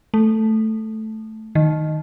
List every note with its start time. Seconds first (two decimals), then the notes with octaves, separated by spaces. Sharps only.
0.14 A3
1.55 D#3